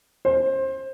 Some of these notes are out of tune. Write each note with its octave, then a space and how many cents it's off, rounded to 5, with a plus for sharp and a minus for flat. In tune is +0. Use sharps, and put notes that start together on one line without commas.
C5 +25